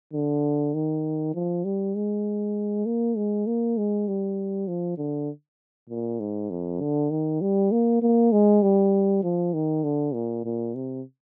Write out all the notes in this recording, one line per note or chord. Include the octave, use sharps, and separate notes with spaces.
D3
D#3
F3
G3
G#3
A#3
G#3
A#3
G#3
G3
F3
D3
A#2
G#2
F2
D3
D#3
G3
A#3
A#3
G#3
G3
F3
D#3
D3
A#2
A#2
C3